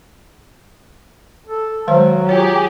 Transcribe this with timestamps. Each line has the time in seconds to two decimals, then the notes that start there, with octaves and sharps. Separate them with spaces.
1.47 A4
1.88 D#3 F#3 G#3 C5
2.29 F4 G4 G#4 C#5